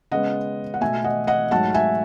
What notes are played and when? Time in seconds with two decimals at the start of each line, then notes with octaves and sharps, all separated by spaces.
0.11 C#3 G#3 B3 D#5 F#5
0.74 F#5
0.81 B2 A3 E5 G#5
1.04 D#5 F#5
1.27 D#5 F#5
1.51 G#2 F#3 A3 F#5 A5
1.74 E5 G#5